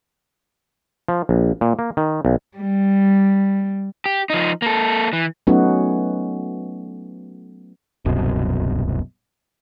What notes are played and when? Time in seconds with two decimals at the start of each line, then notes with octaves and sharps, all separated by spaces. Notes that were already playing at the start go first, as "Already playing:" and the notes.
1.08 F3
1.29 A#1
1.61 A#2
1.79 A#3
1.97 D#3
2.25 B1
2.57 G3
4.06 G4
4.30 F3 D#4
4.62 A#3 A4
5.13 E3
5.47 F#3 A3 B3 C#4 D#4 F#4
8.05 D1 C2 F#2 B2